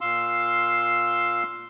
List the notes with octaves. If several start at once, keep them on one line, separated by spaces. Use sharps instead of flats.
A#2 F5 C6 E6